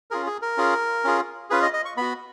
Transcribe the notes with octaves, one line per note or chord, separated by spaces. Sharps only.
C#4 F4 G#4 A#4
G#4
A#4
C#4 F4 G#4
C#4 F4 G#4
C#4 F4 G#4 B4
D#5
D#5
C#6
B3 F#4 B5